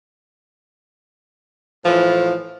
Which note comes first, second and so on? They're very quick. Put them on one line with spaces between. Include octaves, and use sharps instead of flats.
A2 F3 E3